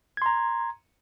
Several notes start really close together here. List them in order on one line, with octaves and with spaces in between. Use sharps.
G#6 C6 A#5